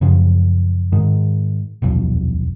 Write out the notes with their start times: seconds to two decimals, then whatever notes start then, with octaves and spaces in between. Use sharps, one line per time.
0.01 F#2 C#3 F3
0.92 G#2 D#3
1.82 D#1 B1 F2